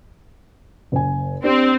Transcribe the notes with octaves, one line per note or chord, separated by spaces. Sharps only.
F#1 G#5
C4 D4 G4